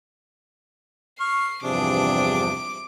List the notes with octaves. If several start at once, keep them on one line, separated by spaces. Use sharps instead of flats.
C#6 F6 C7
E2 G2 C3 F3 D4 G#4 D6